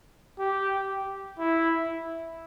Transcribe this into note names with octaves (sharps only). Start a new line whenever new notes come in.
G4
E4